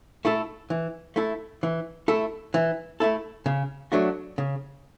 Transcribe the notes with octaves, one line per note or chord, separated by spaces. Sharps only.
A3 E4 A4
E3
A3 E4 A4
E3
A3 E4 A4
E3
A3 E4 A4
C#3
F#3 A3 D4 F#4
C#3